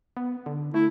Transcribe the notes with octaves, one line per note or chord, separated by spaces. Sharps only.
B3
D3
A3 E4